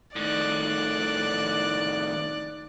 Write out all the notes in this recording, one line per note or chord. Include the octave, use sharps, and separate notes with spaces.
A2 D#3 D5 F#6